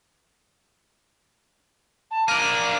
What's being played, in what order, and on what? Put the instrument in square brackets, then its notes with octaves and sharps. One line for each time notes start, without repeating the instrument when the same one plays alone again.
[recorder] A5
[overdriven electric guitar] A#3 D4 [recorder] F6 [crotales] D#7